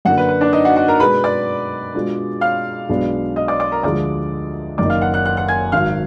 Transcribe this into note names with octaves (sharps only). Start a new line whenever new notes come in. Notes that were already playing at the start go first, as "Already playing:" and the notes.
F#2 D3 F#3 A#3 D4 F#4 F#5
B4
B4
D4 D5
D#4 D#5
F#4 F#5
F#4 F#5
A#4 A#5
B2 G#3 D4 G#4 B4 B5
D5 D6
B2 G#3 D4 F4 G#4
F5 F6
B1 B2 G#3 B3 D4
D#5 D#6
D5 D6
D5 D6
A#4 A#5
D2 D3 F3 G#3 D5 D6
F#1 F#2 D#3 A#3 D#4 D5 D6
F5 F6
F#5 F#6
F#5 F#6
F#5 F#6
F#5 F#6
G#5 G#6
G#1 G#2 F#3 F5 F6